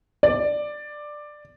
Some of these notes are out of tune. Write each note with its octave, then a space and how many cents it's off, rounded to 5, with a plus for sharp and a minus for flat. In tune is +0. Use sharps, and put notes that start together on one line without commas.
D5 +10